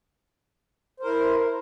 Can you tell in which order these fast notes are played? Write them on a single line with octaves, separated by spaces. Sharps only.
C5 A#4 E4